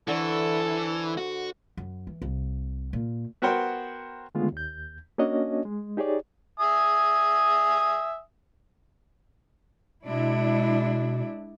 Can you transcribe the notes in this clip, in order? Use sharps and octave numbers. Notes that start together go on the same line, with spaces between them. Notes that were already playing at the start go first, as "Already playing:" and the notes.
D3 E3 A4 C5 C#6
F#4
F#2
E3
C2
A#2
B3 F#4 A#4 C5 F#5 G5
D3 D#3 G#3 A3 B3 F4
D#2 G6
A#3 C#4 D4 F#4 C#5 D#5
G#3
D#4 G4 G#4 C#5 D5
E5 G#5 D#6
B2 G#3 D4 E4